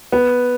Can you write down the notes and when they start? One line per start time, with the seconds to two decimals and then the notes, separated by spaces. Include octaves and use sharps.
0.12 B3